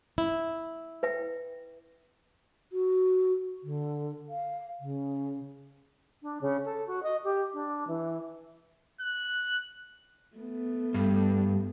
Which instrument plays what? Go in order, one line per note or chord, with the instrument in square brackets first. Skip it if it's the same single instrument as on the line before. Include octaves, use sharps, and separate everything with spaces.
[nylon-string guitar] E4
[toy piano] B4 E5 G5
[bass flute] F#4
D3
F5
C#3
D4
C#3
A4
F#4
D#5
G4
D4
E3
[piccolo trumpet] F#6
[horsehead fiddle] A3 B3
[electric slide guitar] G2